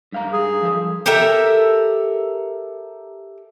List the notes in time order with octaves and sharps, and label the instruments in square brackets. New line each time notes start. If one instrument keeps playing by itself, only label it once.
[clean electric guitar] G2 F5 A#5
[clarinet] G#4
[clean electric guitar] F3 A4
[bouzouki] G4 A4 A#4 E5